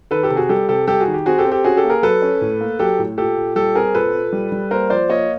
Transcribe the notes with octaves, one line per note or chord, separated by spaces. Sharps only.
D#3 A4 B4
G4 A4
C3
F#4 G#4
G3 G4 A4
C3 G4 A4
G3 G4 A4
F#4 G#4
D#3
G4
C4 F#4 G#4
G4 A4
C4
G4 A4
C#4 F#4 G#4
G4 A4
A#3
G#4 A#4
F#3 A4 B4
C#4
A2
A#3
F#3 G4 A4
A2
A#2 G4 A4
A#2
G3 G4 A4
C4 G#4 A#4
A#2 A4 B4
A#2
G3
G3
A#3 A#4 C5
F3 C5 D5
A#3 C#5 D#5